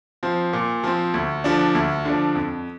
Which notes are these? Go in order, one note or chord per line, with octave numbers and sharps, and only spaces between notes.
F3 C4
A#2
F3 C4
D2
D3 F3 D4
D2
D3 F3 D4
F2